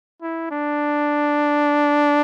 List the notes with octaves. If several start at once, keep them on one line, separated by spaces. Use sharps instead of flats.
E4
D4